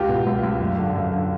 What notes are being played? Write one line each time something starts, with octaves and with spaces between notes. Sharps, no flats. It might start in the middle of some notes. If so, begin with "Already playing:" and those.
Already playing: C#2 F4 G4
B2
C#2
C#2
F#2
D3
F#2
D3